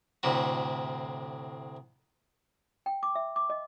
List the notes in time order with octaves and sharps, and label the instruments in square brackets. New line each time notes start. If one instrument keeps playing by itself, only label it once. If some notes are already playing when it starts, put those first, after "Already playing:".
[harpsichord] D2 A2 C3 F#4
[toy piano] G5
D6
E5
D6
D#5